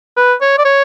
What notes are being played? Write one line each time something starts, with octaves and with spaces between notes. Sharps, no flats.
B4
C#5
D5
C#5